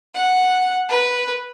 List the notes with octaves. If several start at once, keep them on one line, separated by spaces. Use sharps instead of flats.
F#5
B4